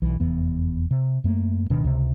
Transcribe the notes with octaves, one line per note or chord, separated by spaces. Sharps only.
B1 E3
F1 E2 E3 B3
C3
F#2 A3 A#3
D1 B2 D#3 D4
C#2 C3